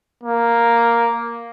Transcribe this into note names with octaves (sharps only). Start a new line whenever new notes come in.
A#3